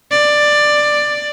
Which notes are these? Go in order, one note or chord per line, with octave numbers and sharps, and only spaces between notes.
D5